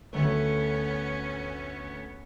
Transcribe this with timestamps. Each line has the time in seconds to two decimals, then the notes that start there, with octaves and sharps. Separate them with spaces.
0.13 D2 A3 B3 C#4